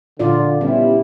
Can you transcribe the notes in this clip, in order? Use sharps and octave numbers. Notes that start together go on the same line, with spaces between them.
A#2 D3 F4 D5
G3 B3 C#4 E4